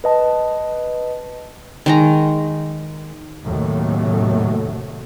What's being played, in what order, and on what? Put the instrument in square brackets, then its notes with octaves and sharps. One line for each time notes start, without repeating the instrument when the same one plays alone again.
[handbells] B4 D#5 A5
[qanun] D#3 G#3 A#5
[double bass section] D#2 A2 C3 D#3 F#3 A3